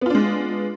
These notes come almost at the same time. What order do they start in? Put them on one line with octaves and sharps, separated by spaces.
B3 F4 D4 G#3